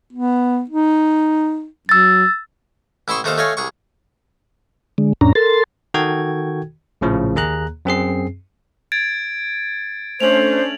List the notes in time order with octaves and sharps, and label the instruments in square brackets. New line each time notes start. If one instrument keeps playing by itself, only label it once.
[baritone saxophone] B3
D#4
[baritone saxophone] F#3 [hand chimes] E6 A6
[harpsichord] A1 E4 E5 C6 C#6 D#6
D#2 A3 D#4 C5 D#5 F5
A3 C#5 D#5 F5 G#5
C2 G#4 C#6
[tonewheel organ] D3 G#3
F2 A2 C#4 D4 A#5
A4 A#4 C6 A6
[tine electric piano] D#3 F#4 A4 G5 G#6
A#1 A2 C#3 F3
D#2 A#3 G#4 A#5 F#6
F#2 C4 G#4 C7
[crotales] G#6 A6 D7
[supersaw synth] A3 C#4 D4 [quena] C5 [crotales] F7 F#7